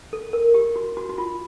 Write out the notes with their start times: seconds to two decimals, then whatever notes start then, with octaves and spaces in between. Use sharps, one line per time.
0.13 A4
0.33 A#4
0.54 G4
0.76 F#4
0.97 F#4
1.09 F#4
1.18 F4